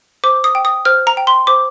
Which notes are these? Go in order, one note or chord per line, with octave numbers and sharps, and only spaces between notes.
C5 D6
D#6
G5
D#6
C5 F6
A#5
G5
C6
C5 D6